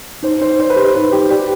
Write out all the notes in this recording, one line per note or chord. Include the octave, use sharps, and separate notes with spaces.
D#4 C5
D#4 C5
C5 D5
B4
G4 C5
D#4 B4
D#4 G4
G4 D5